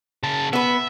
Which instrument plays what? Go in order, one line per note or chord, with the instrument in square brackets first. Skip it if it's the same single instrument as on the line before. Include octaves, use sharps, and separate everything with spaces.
[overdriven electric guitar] C#3 A5
[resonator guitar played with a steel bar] B3 B4 [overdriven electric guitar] E5